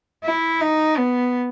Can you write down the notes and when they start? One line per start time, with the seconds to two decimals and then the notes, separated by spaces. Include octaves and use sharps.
0.24 E4
0.61 D#4
0.97 B3